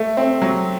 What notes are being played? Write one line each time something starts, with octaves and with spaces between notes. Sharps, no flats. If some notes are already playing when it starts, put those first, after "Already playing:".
Already playing: A3
C4
F#3